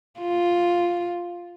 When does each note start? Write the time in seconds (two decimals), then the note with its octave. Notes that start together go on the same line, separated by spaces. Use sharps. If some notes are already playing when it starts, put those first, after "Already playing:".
0.20 F4